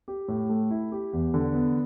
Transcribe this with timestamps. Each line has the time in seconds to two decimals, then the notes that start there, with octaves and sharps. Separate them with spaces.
0.08 G4
0.28 A2
0.49 A3
0.71 E4
0.92 G4
1.13 E2
1.34 D3
1.54 B3